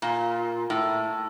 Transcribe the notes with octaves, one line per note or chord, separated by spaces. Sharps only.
A#2
A2